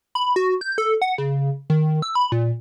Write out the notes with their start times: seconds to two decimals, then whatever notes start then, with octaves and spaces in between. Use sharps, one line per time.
0.15 B5
0.36 F#4
0.61 G6
0.78 A4
1.02 F#5
1.18 C#3
1.70 D#3
2.02 E6
2.15 B5
2.32 A#2